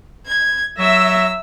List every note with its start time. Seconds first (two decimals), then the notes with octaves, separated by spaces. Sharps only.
0.26 G#6
0.79 F#3 E5 E6 A#6